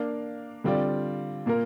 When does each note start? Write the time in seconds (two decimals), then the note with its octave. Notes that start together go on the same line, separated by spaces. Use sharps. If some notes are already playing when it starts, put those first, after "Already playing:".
Already playing: A#3 D4 A#4 F5
0.64 D3 G3 C4 F4 D5
1.46 A#2 A#3 F4 A#4